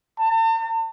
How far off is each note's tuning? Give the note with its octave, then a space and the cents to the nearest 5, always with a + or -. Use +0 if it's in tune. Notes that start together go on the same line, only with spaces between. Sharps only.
A5 +45